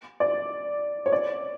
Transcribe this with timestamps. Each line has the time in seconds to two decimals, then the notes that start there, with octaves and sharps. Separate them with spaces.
0.20 D5
1.06 C#5
1.12 D5